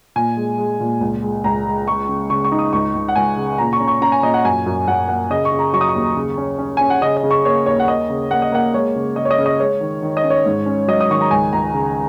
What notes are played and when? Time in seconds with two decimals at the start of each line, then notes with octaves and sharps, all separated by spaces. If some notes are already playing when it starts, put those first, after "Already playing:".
0.16 A#2 G#5
0.37 G#3
0.58 G#3
0.80 A#2
1.01 C#2
1.22 G#3
1.44 C#2 A#5
1.66 G#3
1.87 G#3 C#6
2.08 C#3
2.30 C#3 C#6
2.45 C#6
2.52 D#4
2.59 D#6
2.73 C#2 C#6
2.94 C#2
3.09 F#5
3.16 C#2 G#5
3.37 C#3
3.58 A#2 A#5
3.73 C#6
3.80 C#4
3.88 C#6
4.01 C#4 A#5
4.12 G#5
4.23 A#2 D#5
4.34 F#5
4.45 F#2 G#5
4.66 F#2
4.88 F#2 F#5
5.08 A#3 F#5
5.30 C#3 D#5
5.45 C#6
5.52 C#3
5.59 A#5
5.73 F#3 C#6
5.81 D#6
5.89 C#6
5.95 D#2
6.16 C#3
6.38 C#4
6.58 C#4
6.77 C#4 G#5
6.90 F#5
7.01 C#3 D#5
7.17 D#5
7.23 C#3
7.31 C#6
7.45 A#3 C#5
7.66 D#2 C#5
7.80 F#5
7.88 A#3 D#5
8.10 C#3
8.31 A#3 F#5
8.42 D#5
8.52 A#3 F#5
8.74 G#3 C#5
8.96 C#3
9.16 C#3 D#5
9.25 C#5
9.31 D#5
9.38 C#3
9.46 D#5
9.60 G#3 C#5
9.81 D#3
10.02 D#3
10.17 D#5
10.24 C#4
10.30 C#5
10.46 G#2
10.66 C#4
10.88 F#3 D#5
11.01 D#6
11.10 D#3 C#6
11.21 A#5
11.31 C#2 G#5
11.53 C#2 A#5
11.74 C#3